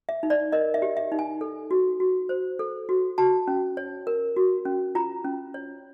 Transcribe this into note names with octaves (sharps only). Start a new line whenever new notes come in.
E5
D#4
D5
A#4 D#5
E5
G4
E5
D#4
G#5
A4
F#4
F#4
C5
A4
F#4
F#4 A5
C#4
C#5
A#4
F#4
C#4
F4 A#5
C#4
C#5